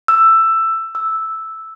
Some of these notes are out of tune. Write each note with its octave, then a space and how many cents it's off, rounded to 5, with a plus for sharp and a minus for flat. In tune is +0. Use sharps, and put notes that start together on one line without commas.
E6 +10
E6 -5